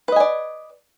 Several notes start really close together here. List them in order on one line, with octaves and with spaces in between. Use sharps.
B4 D#5 G#5 D5